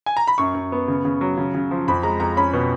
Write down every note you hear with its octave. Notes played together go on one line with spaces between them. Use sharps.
G#5
A#5
B5
F#2 C#6
F#2
B3
C#3
C#3
F#3
C#3
C#3
F3
F2 B5
G#3 A#5
F2 A#5
C#4 B5
B2